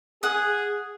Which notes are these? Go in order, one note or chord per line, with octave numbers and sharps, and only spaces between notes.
G#4 F#5 D#6